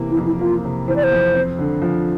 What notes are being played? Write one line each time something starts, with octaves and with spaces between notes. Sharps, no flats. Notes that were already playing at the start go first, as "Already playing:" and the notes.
Already playing: C3 E3 A#3
E4
F2
E4
A#3 F4
C3
E3 C5
D5
C5
F2
C4
D3
F3